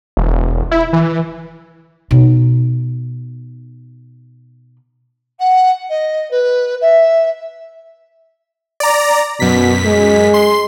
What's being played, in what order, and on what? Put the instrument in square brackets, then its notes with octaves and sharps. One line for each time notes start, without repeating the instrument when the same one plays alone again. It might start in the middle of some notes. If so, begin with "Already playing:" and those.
[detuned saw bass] E1
E4
E3
[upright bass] B2 D#4
[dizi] F#5
D#5
B4
E5
[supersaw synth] D5 A#5
[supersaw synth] F#2 B6 [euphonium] B2
[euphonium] G#3
[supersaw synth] C6